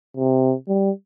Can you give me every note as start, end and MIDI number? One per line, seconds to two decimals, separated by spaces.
0.17 0.54 48
0.68 0.91 55